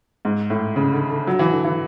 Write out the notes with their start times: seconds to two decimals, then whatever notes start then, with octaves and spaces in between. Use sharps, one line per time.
0.25 G#2
0.50 A2
0.76 C#3
0.93 D3
1.10 D3
1.27 F#3
1.39 E3
1.52 D3
1.65 E3